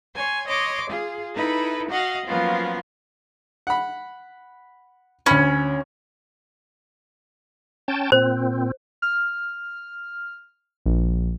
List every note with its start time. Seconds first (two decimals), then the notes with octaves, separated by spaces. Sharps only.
0.15 C#5 G#5 C6
0.48 C#5 D#5 C6 D6
0.89 F4 G#4
1.34 D#4 E4 A4 B4
1.89 F#4 D#5 F5 F#5
2.26 F3 F#3 A#3 B3 C#4 F4
3.67 F#5 B5
5.26 D2 C#4 B5
7.88 C#4 G5 A5
8.12 A#2 C4 C5
9.02 F6
10.86 A#1